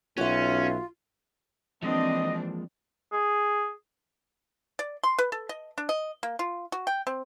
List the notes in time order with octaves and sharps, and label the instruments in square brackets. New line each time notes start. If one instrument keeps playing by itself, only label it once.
[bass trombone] B1 [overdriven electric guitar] C#4 [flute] F4 [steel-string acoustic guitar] F#4 E5
[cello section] E3 C4 D4 [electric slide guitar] F3 G#3 A#3 [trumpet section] D#5
[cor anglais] G#4
[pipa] D5
C6
B4
A4
D#5
D4
D#5
A#3
F4
F#4
G5
C4